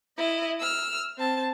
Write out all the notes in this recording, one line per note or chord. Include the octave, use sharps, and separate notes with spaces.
E4 D#5
E6 F6
C4 A5